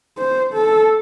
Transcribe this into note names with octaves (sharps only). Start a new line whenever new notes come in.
C5
A4